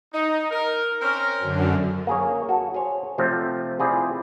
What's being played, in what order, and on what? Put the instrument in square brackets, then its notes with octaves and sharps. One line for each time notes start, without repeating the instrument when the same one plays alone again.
[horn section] D#4
A#4
C4 C#4 A#4
[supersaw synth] F#2 D3
[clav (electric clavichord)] A#3 G#4 C#5
F#4 A4
G#4 C5 C#5
C3 F3 A3 C4
C4 E4 F4 G4 G#4 D5